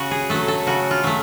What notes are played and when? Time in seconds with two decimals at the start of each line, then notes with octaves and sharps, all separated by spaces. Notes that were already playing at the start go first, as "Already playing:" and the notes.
Already playing: C#3 F#4
0.11 G#4
0.30 F#3 A3 A4
0.48 A4
0.67 C#3 F#4
0.91 F4
1.04 F#3 A3